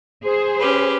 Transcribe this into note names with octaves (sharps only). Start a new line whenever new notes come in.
G#4 C5
C#4 G4 B4